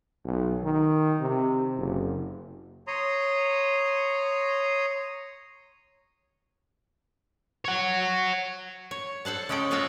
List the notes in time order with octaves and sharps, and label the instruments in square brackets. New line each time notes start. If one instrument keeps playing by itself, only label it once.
[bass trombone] B1
D#3
C3
F#1
[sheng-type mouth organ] C#5 A#5 C6 D#6
[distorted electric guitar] C#5 F#5
[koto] C#5
A4 C5 F#5 A5
C#3 G#3 C#4 A4 G5
G#3 F4 F#4 G#4 A4 C#5